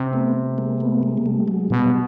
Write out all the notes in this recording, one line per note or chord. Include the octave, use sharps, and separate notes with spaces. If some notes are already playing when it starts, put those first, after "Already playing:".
Already playing: C3
A3 B3
G#3 A#3
A3 B3
G#3 A#3
A#3
G3 A3
F#3 G#3
B2 G3